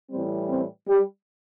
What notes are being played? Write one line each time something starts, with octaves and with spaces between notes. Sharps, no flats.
A2 E3 G3 C4
C4
G3